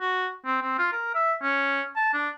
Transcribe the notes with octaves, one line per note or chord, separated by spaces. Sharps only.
F#4
C4
C4
F4
A#4
E5
C#4
A5
D4